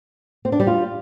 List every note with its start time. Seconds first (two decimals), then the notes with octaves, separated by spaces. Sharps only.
0.45 C4
0.52 D4
0.60 G3
0.67 F4